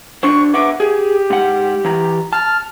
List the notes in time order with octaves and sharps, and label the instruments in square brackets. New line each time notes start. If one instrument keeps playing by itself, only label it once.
[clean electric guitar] D3 D4 C5 [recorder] C#6
[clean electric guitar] B4 E5 F#5 [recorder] D6
[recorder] G4 [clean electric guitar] G#4
[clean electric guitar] G#2 F#5
E3 A#5
[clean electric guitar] A5 [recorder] F6